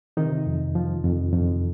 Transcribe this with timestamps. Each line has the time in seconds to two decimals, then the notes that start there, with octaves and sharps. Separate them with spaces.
0.17 C3 D#3 D#4
0.47 F2
0.75 F3
1.04 F2
1.33 F2